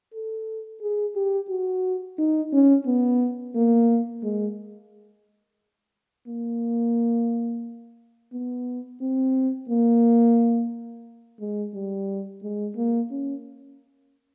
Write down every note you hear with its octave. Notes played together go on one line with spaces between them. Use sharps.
A4
G#4
G4
F#4
D#4
C#4
B3
A#3
G#3
A#3
B3
C4
A#3
G#3
G3
G#3
A#3
C#4